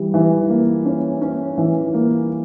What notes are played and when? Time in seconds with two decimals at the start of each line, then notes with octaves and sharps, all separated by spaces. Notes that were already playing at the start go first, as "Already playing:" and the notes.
Already playing: E3 G3
0.14 E3
0.50 A#3
0.85 C#4
1.21 C#4
1.58 E3
1.94 A#3